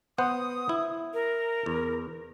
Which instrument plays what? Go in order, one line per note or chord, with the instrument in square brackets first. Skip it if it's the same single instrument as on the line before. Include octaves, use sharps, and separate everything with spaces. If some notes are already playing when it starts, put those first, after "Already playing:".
[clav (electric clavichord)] B3 C5 F#5 [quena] D#6
[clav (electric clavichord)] E4
[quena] A#4
[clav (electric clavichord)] E2